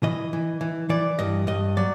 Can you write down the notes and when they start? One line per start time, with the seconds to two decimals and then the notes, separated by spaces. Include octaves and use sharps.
0.03 E3 D#5
0.33 E3
0.61 E3
0.89 E3 D5
1.19 G2 D#5
1.47 G2 D#5
1.77 F#3 D5